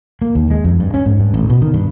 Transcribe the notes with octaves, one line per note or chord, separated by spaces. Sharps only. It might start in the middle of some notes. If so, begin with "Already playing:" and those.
A#3
D#2
G#3
F2
G2
C#4
G#2
G2
A1
B2
D#3
G2